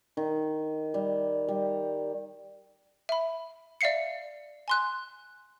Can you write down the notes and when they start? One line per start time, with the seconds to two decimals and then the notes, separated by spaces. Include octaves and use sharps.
0.17 D#3
0.94 G3
1.48 G3
3.09 E5 B5
3.81 D5 E5 F5 C7 C#7
4.68 G#5 C6 F#6